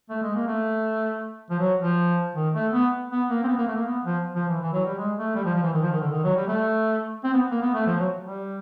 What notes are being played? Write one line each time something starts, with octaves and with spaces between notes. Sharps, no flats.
A3
G#3
A#3
A3
F3
F#3
F3
D#3
A3
B3
B3
A#3
C4
B3
A#3
A3
A#3
B3
F3
F3
E3
E3
F#3
G3
G#3
A3
G3
F3
F3
E3
D#3
F3
D#3
D3
D#3
F#3
G3
A3
C4
B3
A#3
B3
A3
F3
F#3
G3